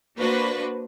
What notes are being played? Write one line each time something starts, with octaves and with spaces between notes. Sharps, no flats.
A#3 D4 F#4 B4 C5